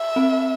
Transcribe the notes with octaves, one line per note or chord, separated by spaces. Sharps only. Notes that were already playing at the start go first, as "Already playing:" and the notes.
Already playing: E5
C4